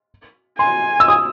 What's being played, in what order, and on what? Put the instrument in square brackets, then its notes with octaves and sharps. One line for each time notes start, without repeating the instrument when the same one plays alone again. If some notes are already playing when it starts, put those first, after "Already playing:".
[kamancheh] G#5 [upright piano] C6
[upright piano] E6
D#6